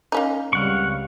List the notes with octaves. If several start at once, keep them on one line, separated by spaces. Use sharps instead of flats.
A#3 C#4 D#4
C#2 G3 C4 F5 F#5 C#6